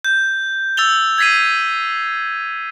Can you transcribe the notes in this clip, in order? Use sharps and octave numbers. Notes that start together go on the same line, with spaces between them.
G6
E6 A6 F7 G7
G#6 A6 B6 C7 D#7